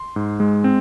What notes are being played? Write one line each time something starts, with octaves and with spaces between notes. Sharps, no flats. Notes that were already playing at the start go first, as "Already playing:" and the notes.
Already playing: C6
G#2
G#3
C4